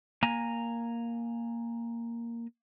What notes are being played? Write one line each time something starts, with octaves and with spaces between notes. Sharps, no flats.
A#3 G#5 A#5